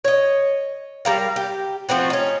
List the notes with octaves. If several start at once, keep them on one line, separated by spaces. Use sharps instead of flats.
C#5 D#5
G3 A#4 F5
G4
F3 A3 C4 F#4
C#4 D#4